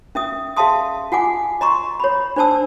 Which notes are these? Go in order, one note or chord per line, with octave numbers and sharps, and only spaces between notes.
C#4 E5 D#6
G#4 E5 F5 A5 C6 D#6
F4 F#5 G#5 D6
D#5 A#5 C6 C#6
C#5 B5
D4 C5 D5 A5 E6